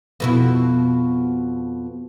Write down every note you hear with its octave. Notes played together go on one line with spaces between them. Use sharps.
F2 B2 E4